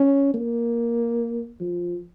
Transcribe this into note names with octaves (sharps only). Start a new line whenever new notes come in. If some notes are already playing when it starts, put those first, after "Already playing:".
Already playing: C#4
A#3
F3